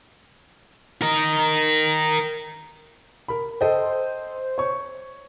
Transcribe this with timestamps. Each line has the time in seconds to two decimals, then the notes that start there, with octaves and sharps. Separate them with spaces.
1.02 A#4 D#5
3.28 A#4 B5
3.61 A4 C5 D#5 G5
4.58 C#5 C#6